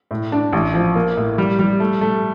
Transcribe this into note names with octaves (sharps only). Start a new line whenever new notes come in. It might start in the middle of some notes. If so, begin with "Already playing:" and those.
A2
D4
A1
F3
A#3
A2
G3
G3
A3
A3